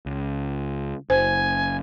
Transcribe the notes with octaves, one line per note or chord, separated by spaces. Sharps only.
C#2
F#1 C5 G#5